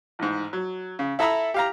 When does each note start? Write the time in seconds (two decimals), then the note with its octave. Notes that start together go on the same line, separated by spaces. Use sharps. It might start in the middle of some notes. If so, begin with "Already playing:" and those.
0.19 A1 G#2
0.53 F#3
0.99 C#3
1.19 E4 A4 E5 A#5 B5 E6
1.54 G4 F5 A#5